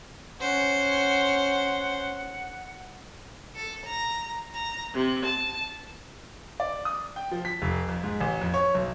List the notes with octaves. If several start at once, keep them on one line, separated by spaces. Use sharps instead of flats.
C#4 C5 F#5
A4
A#5
A#5
C3
A5
D5
D#6
G5
F3
B6
F1
F2
G#2
A1
F2
C#5
B1